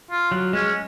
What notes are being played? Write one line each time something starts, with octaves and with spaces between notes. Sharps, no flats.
F4
F#3
G#3 C#4